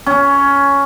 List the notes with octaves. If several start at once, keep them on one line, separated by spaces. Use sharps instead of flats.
C#4